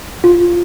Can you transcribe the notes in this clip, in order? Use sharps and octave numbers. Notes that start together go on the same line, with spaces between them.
F4